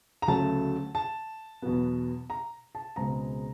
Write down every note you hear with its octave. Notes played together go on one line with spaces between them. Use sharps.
A#5
D2 C#3 F#3 A3 A5
A5
E2 B2 F#3 B3
A#5
A5
C#2 B2 G#3 C4 A#5